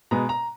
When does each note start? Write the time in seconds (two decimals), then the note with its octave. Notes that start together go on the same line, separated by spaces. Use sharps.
0.11 B2 G#3 B3 A#5
0.29 A#5